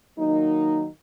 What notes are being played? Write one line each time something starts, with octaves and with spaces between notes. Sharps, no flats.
D#3 F#3 A#3 D#4